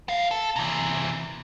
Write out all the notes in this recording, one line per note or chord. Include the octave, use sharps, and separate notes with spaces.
B3 F5
A4
C3 E3